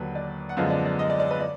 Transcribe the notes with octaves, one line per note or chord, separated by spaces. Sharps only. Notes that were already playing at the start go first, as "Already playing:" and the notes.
Already playing: D#2 D3 F#3 B4
D5
F#5
F#2 D3 F3 G#3 B3 F5
D5
D5
D#5
D5
D5
B4
D5